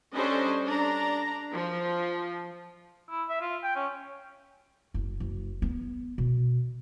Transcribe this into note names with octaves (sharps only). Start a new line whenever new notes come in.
G3 C#4 D4 A4 C5 D#5
D4 A#5
F3
E4
E5
F4
G5
C#4
F#1
F#1
B3
B2